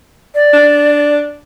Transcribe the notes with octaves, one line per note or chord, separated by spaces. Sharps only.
D5
D4